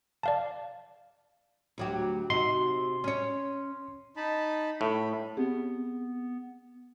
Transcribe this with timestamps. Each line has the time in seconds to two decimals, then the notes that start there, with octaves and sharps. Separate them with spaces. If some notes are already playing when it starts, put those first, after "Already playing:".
0.23 D5 F5 A5
1.78 D2 F#3 G4
2.30 C3 D#4 F#4 C6
3.04 C#4 C#5
4.17 D#4 A5 B5
4.81 A2 B5
5.37 B3 C4 G4 G#4